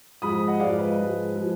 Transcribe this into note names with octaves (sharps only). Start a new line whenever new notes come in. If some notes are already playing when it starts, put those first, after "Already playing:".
G#2 F3 G#3 B5 D#6
D#5 F#5
G#2 F3 G#3 D5 F5
B4 D#5
G#2 F3 G#3
F3 G#3